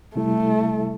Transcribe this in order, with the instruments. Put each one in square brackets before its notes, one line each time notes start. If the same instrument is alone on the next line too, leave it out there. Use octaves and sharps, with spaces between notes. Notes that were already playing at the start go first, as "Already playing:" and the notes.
[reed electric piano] C3 G3 E4 A4 [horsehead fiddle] A3